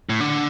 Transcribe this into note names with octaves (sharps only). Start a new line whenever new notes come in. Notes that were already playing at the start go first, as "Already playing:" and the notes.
A2
D3